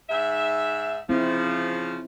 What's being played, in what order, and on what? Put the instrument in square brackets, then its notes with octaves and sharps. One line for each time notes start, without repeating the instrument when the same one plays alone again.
[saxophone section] G#2 E5
[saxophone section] C#3 F3 [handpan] C4 E4